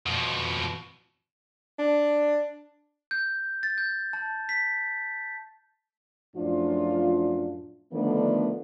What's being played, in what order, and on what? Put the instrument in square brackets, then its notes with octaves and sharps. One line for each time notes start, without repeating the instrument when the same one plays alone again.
[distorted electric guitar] F2 B2
[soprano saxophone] D4
[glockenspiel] G6
A6
G6
A5
B6
[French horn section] F#2 A2 F3 D4 F4
D3 D#3 F3 A3 B3 D4